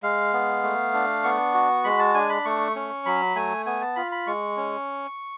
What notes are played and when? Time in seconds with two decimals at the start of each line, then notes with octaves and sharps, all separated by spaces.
0.03 G#3 F5
0.33 B3
0.63 A3
0.94 D4
1.24 B3 C#6
1.54 F#4
1.84 G#3 B5
2.00 A5
2.14 D4 G#5
2.30 B5
2.45 A3 C#6
2.76 C#4
3.06 F#3 B5
3.35 A3 G#5
3.66 B3 G#5
3.81 A5
3.96 F4 B5
4.12 B5
4.27 G#3 C#6
4.57 C#4